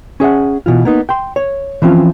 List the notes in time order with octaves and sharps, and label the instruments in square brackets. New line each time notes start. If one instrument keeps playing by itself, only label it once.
[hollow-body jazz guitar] C#4 G#4 E5 F#5
B2 E3 F4
A#3 B3 D#4
G5 C6
C#5
E3 F3 C4 C#4 F4